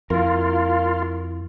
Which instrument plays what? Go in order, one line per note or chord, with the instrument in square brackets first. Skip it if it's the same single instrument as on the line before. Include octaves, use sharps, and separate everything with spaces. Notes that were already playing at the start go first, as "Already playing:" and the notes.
[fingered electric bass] F2 [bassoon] A#3 [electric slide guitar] E4 A#4 [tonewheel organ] F4